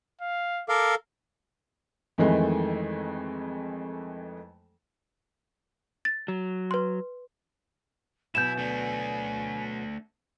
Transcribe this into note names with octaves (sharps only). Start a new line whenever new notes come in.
F5
A4 A#4 F5 D6
F2 D#3 E3 G#3 A3
A6
F#3
B4 C6
B2 F#3 E4 G#5 G6 E7
A3 D4